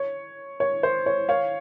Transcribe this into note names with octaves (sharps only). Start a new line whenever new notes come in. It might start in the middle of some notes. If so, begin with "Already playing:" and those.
Already playing: C#5
C#5
C5
C#5
C#5 F5